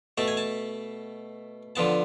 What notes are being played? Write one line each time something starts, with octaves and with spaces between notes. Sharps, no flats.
B2 A3 A5
G#5
A5
D3 F3 B3 A5